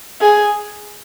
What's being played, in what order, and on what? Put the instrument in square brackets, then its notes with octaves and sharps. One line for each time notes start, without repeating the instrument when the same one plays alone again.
[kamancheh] G#4